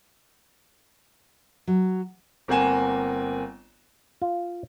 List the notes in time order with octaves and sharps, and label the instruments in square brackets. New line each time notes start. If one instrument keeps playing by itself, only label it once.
[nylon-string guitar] F#3
[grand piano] G1 A#3 C4 F#5 G#5 E7
[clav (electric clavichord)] F4